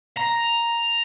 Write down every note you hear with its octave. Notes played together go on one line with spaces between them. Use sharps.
A#5